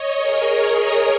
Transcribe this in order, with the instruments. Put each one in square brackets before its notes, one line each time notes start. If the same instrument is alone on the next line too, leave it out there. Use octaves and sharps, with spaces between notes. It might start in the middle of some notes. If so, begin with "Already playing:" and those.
Already playing: [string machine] C#5 D#5
G#4 A#4